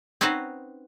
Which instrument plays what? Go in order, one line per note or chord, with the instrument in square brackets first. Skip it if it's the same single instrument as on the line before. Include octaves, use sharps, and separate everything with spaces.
[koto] C4 C#4 D#4 F#4 B4 C5